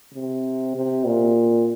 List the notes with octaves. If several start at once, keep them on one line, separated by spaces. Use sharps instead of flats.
C3
C3
A#2